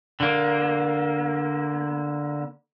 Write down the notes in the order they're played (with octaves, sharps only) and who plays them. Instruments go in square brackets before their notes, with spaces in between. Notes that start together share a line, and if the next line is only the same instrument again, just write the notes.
[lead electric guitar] D3 A#3